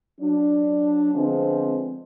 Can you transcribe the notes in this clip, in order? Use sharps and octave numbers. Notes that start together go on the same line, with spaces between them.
F#3 D4
D3 F3 G#3 B3 C4